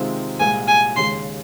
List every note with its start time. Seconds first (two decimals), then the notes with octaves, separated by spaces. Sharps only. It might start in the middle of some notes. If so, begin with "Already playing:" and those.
Already playing: C3 D#3 G#3 C4 F4
0.40 C2 A#2 G#3 G#5
0.68 G#5
0.96 D#2 C#3 G#3 C6